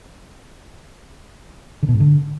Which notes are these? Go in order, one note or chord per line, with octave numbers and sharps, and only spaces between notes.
D3
B2
G#2
D3